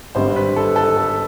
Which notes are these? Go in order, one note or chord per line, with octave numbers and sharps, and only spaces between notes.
G#1 G2 D3 G3 C5
B4
A4
A4
A4